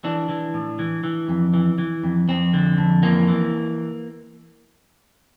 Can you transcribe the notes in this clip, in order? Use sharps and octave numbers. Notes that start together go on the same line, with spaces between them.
E3 D4
E3
A2
E3
E3
F2
E3
E3
F2
F2 C4
D3
F2
E3 A#3
E3